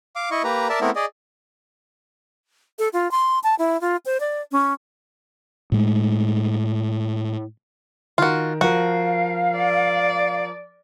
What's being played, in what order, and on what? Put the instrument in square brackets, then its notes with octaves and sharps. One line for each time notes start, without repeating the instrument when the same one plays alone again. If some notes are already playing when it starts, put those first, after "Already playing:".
[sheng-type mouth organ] F5 D6
E4 D#5 C#6
A#3 G4 B4 A#5
A#4 D5 E5 A5
A3 B3 C4 E4 A#4
G#4 D5 D#5
[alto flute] A4
F4
C6
A5
E4
F4
C5
D5
C#4
[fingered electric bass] A2 G#3 A3
[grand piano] D#3 A#4 [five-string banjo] F4 F#4
[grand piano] F3 A#4 [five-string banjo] F#4 [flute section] F5
[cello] D5